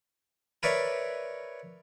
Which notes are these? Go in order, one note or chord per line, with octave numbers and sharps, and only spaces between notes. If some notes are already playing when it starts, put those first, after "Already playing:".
A#4 B4 C#5 D5 E5